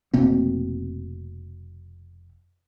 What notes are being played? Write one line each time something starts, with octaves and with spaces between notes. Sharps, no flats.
F1 B2 A#3 C4